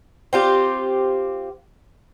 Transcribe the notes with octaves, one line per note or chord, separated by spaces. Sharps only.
C4 F4 G4